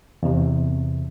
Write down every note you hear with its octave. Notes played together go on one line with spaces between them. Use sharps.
E2 C3